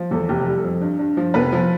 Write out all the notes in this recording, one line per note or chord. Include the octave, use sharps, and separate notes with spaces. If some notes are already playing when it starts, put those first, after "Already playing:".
Already playing: F3
E2 A4
F1 G4
G3
A4
F2
G2
G2
F3
F1 B3 B4
F3